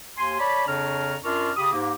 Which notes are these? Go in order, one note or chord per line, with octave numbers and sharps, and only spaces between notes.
D#2 G#5 C6
C#5 D5 A5 B5
F2 C#3 D4 C#5 A#5 F6
F#2 D4 F4 A#4 C#6 F6
C#3 G4 B5 D#6
G#2 A#3 G4